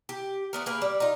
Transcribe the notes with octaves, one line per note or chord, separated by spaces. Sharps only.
G4
A3 B3 A#4
A#3 G#4 A#4 B4
G3
D#4 F4